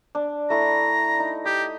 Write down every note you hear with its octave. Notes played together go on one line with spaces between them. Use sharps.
D4
A3 E4 A#5
D#4
G4 D#5